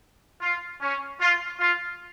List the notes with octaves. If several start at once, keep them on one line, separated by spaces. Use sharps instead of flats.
F4
C#4
F4
F4